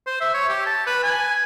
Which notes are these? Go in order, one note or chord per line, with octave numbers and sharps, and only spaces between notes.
C5
E5
C#5
G4
A5
B4
G#5